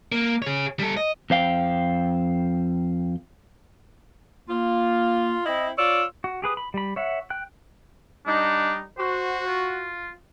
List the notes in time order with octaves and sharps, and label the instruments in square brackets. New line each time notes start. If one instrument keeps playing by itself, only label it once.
[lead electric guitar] A#3
G#4 C#5
G3 A4
D#5
[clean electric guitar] F2 C5 F5 G5
[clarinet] A#3 [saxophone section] F4
[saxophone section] C4 E4 [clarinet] D#5
[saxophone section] F4 C#5 D5 [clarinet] E6
[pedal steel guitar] F#4
G4 G#4 B4 D#6
B5
G3 B5
C#5 E5 F#5
G5 F#6
[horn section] G3 D#4 [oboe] D4
[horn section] F#4 [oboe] C5
[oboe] F4